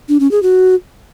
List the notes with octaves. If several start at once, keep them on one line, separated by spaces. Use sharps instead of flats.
D4
C#4
G#4
F#4